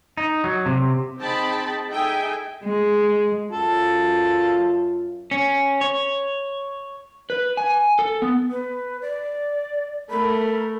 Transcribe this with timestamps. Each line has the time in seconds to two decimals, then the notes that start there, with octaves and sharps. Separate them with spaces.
0.17 D#4
0.44 F#3
0.66 C3
1.20 C4 D#4 G#4 G5 A5 B5
1.90 D#4 G#4 A4 E5 G5 G#5
2.64 G#3
3.51 F#2 F4 A4
5.31 C#4
5.81 C#5
7.30 B4
7.57 G#5
7.99 A4
8.22 B3
8.51 B4
9.02 D5
10.10 A3 A#4 B5